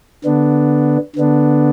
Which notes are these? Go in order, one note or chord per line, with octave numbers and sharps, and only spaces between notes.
D3 B3 D4
D3 B3 D4